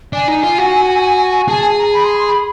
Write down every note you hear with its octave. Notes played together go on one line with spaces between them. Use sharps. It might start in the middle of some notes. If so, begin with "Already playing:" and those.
D4 G#5
D#4
F4
F#4
G#4 A5
G#5
A#5
A#5
B5
C6
C6
B5